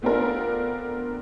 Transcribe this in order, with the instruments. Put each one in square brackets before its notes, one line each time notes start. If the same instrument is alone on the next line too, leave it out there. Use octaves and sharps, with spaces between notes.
[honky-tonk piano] A3 B3 C4 D4 F4 A#4